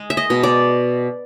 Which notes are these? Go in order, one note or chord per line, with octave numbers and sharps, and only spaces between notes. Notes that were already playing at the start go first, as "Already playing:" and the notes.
Already playing: G#3
E5
D#5
B2
D5